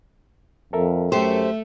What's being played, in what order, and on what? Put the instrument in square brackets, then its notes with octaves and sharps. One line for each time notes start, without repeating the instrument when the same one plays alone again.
[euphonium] F2 [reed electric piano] A4 A#4 E5
[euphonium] F#2 [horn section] A3 [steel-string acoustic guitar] G4 C5